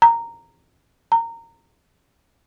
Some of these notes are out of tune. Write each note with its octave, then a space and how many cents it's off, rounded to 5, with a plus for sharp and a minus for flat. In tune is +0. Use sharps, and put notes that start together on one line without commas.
A#5 -10
A#5 -20